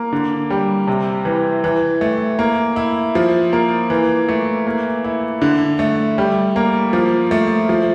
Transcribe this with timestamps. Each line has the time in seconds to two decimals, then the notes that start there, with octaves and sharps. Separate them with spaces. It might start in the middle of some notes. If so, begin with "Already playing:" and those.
Already playing: A#3
0.13 D3
0.50 G3
0.87 C3
1.25 E3
1.64 E3
2.01 A3
2.39 A#3
2.76 E4
3.15 F3
3.53 A#3
3.90 E3
4.29 A3
4.67 A#3
5.04 E4
5.42 D3
5.79 A3
6.18 G3
6.56 A#3
6.93 F3
7.31 A3
7.69 F3